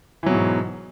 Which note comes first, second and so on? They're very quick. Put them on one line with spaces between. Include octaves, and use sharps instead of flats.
E3 F#3 B2 G#2